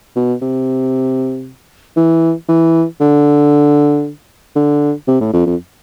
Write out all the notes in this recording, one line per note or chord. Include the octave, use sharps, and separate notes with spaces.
B2
C3
E3
E3
D3
D3
C3
A2
F2
F2